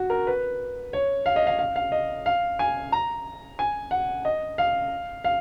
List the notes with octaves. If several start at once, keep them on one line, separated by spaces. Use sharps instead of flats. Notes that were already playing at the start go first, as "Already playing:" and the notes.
Already playing: F#4
A#4
B4
C#5
F5
D#5
F5
F5
F5
D#5
F5
G#5
A#5
G#5
F#5
D#5
F5
F5